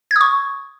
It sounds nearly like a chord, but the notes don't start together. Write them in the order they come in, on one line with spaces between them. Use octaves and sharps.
G#6 D#6 C#6